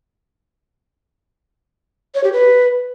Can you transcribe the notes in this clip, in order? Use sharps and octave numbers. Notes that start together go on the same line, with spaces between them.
C#5
G4
B4